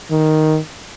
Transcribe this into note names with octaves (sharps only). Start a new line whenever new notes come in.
D#3